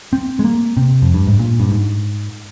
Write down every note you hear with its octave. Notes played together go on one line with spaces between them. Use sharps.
C4
G#3
A#3
C3
F2
G2
G#2
A#2
G2
G#2